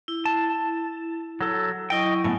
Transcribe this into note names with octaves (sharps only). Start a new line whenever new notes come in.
E4
A5
F#3 A4
F#3 E4 D#5 G5 C#6
A2 A3 B3 G#5